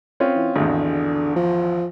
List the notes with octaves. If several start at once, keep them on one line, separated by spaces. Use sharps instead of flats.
C4 C#4 F4
E3
G#1 E2 D3
F3